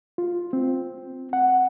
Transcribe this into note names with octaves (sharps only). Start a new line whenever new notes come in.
F4
C4
F#5